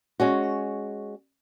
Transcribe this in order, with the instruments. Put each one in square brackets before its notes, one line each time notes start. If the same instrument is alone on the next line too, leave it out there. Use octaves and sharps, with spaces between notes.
[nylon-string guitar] G#3 C#4 F#4